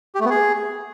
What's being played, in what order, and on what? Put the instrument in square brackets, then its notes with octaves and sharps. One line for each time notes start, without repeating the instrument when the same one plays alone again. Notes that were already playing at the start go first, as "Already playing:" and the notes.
[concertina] G4
A3
B3
G#4